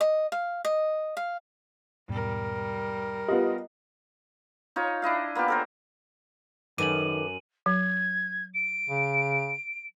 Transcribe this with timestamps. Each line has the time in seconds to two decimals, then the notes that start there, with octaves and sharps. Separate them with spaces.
0.01 D#5
0.32 F5
0.65 D#5
1.17 F5
2.09 E2 G#2 B2 G3 A#4
3.28 B3 F4 G4 D#5
4.76 D#4 F4 C#5
5.02 D4 E4 D#5 F5
5.35 A#3 B3 F4 G4
5.48 A4 A#4 C5
6.78 F#2 D#3 A4 B4 D6 D#7 F#7
7.66 F#3 G#6
8.54 D7
8.89 C#3